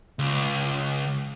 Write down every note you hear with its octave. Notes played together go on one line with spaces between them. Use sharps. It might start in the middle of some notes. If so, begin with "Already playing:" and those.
C#2